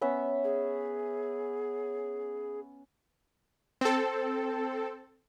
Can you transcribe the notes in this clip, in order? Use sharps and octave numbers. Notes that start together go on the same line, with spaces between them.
B3 C#4 E5
G#4
C4 A4